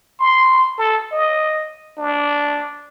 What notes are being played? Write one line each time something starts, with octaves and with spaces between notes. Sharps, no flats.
C6
A4
D#5
D4